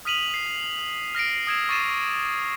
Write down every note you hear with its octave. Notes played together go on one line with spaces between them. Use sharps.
D#6 F6 B6 D#7 F7 F#7
D#6 C7
F6 A#6 C7 D7
D#6 E6 G#6 C7 D7 E7
C#6 D6 A6 C7 D#7 E7